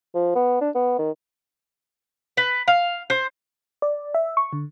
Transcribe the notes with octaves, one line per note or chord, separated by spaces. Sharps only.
F3
B3
D4
B3
D#3
B4
F5
C5
D5
E5
C#6
D3